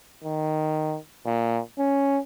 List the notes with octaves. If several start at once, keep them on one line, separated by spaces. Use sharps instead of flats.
D#3
A#2
C#4